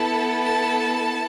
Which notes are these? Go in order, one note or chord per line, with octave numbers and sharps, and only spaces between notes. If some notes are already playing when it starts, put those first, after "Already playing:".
Already playing: B3 E4 A4 A5
A5